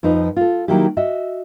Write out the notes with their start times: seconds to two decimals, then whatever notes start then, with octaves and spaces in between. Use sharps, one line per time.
0.03 F2 F3 D#4 B4
0.37 F4 A4
0.68 D#3 F#3 A#3 E4 G4
0.97 F#4 D#5 E5